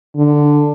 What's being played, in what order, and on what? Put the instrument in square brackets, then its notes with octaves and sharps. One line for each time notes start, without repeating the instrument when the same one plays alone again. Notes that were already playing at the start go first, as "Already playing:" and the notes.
[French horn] D3